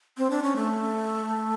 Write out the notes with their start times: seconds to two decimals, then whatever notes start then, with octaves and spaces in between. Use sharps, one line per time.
0.17 C4
0.30 D4
0.43 C#4
0.56 A3